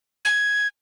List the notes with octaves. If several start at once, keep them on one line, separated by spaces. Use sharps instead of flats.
G#6